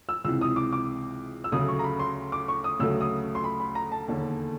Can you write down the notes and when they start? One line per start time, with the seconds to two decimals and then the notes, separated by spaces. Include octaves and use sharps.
0.09 E6
0.24 C#2 C3 E3 E6
0.41 D#6
0.56 D6
0.72 D6
1.44 E6
1.52 D2 C#3 F#3 A3 D#6
1.68 C#6
1.79 A#5
1.84 B5
2.00 C6
2.32 D6
2.48 C#6
2.64 D#6
2.79 D2 C#3 F#3 A3 E6
3.01 D#6
3.35 C6
3.44 B5
3.60 B5
3.75 A#5
3.92 A5
4.08 E1 D#2 D3